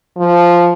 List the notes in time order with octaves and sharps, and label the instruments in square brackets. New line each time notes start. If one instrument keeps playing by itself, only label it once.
[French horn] F3